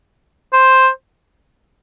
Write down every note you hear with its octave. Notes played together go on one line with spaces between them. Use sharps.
C5